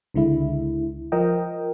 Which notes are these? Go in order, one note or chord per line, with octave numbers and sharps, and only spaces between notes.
C#2 D3 G#3 E4
F3 A#4 D#5 G5